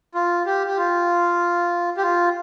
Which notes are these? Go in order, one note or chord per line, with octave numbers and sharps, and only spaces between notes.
F4
G4
G4
F4
G4
F4